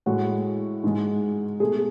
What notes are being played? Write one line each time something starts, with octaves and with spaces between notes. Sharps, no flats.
A2 G#3 F#4
G#2 G#3
B2 A3 G#4